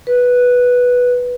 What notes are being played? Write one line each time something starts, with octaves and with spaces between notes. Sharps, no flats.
B4